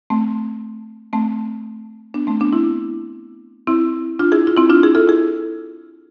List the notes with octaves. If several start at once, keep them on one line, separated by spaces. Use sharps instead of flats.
A3 C4
A3 C4
B3 D4
A3 C4
B3 D4
C4 E4
C4 E4
D4 F4
E4 G#4
F4
C4 E4
D4 F4
E4 G#4
F4 A4
E4 G#4